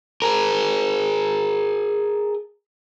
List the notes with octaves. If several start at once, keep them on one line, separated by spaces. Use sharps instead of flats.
G#4 A#4